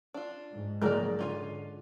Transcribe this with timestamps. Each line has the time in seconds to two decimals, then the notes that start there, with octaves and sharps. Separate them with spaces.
0.14 D4 F4
0.51 G#2
0.82 A#1 D3 D#3 F#3 G#3 A#4 D5
1.19 D3 C#4 D4 F4 D5 G#5